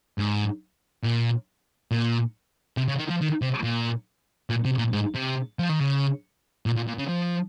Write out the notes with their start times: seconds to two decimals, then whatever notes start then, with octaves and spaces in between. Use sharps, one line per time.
0.19 G#2
1.04 A#2
1.91 A#2
2.77 C3
2.88 C#3
2.98 D#3
3.09 F3
3.21 D#3
3.42 C3
3.64 A#2
4.50 A#2
4.65 C3
4.78 A#2
4.93 G#2
5.15 C3
5.59 F3
5.69 D#3
5.80 C#3
6.66 A#2
6.76 A#2
6.87 A#2
6.98 C#3
7.08 F3